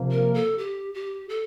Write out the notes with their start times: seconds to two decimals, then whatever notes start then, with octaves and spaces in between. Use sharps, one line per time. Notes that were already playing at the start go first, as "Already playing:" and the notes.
Already playing: C3 F3 A#3
0.11 A#4
0.34 A4
0.58 G4
0.94 G4
1.29 A4